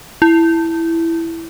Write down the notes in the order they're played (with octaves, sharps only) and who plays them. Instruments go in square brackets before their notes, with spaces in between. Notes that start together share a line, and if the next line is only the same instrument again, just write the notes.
[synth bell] E4